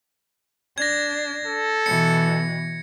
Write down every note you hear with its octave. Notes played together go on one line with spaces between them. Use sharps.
D4 G#6 A#6
A4
B2 E3 C#7